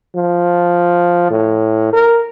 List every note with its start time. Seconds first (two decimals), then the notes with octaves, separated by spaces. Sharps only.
0.15 F3
1.31 A2
1.93 A#4